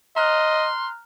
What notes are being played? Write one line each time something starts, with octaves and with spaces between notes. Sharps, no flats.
D#5 A#5 C6 F6 F#6